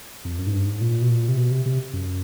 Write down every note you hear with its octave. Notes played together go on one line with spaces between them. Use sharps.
F2
F#2
G#2
G2
G#2
A#2
B2
A#2
C3
B2
C3
C3
F#2